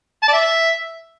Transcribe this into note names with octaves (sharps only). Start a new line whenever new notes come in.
A5
D5
E5